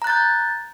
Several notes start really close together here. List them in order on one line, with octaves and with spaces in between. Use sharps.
A#5 F#6 A6 G6